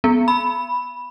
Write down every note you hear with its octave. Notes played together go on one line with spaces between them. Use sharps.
B3
B5